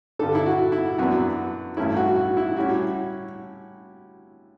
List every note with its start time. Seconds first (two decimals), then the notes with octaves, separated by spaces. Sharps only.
0.19 G2 D3 G3 A4
0.35 E4
0.46 F#4
0.72 E4
0.98 F#2 E3 B3 D4 F#4
1.77 A1 G2 E3 A3 C#4 E4
1.96 F#4
2.16 F#4
2.37 E4
2.56 A2 G3 C#4 E4 F#4